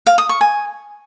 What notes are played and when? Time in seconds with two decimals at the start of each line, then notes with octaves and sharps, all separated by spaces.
0.07 F5
0.18 D#6
0.29 C#6
0.41 G#5